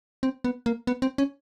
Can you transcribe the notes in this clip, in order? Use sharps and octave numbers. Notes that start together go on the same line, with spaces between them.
C4
B3
A#3
B3
C4
C#4